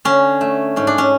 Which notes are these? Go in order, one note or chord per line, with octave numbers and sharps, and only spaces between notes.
D3 C#4
A3
G#2 C#4
D4
C#4